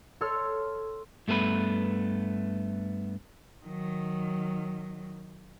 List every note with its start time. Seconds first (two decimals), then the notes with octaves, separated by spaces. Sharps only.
0.21 A4 C#5 C6 E6 F6
1.28 G2 A3 B3 G#4 B4
3.65 D#3 F#3